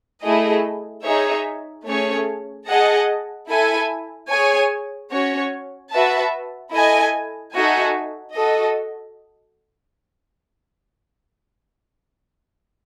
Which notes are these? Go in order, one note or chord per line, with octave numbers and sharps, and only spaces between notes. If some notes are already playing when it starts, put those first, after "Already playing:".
A3 E4 G#4 D#5
D#4 G#4 C#5 E5
A3 C#4 G#4 C#5
G#4 D#5 F#5 A5
E4 A4 E5 G#5
G#4 C#5 G#5
C#4 F#4 C#5
F#4 B4 E5 A5
E4 A4 D#5 G#5
D#4 F#4 A4 E5 G#5
F#4 A4 D#5